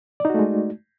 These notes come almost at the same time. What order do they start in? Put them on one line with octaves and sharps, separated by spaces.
D5 D#4 F#4 A3 G#3